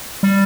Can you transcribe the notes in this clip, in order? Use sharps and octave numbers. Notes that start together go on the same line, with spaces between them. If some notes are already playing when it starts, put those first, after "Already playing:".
G3